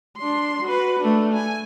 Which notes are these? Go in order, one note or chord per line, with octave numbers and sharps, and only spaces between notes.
D4 C6
F#4 B4
A3 D4
G#5